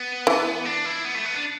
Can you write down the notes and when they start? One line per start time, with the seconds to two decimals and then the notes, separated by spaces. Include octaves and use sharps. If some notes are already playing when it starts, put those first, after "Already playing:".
Already playing: B3
0.27 E3
0.65 D4
0.85 E4
1.05 B3
1.15 A3
1.25 B3
1.35 D4